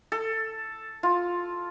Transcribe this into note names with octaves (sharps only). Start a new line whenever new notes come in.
A4
F4